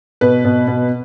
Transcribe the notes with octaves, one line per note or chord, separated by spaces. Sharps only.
B2 B4
B2
B2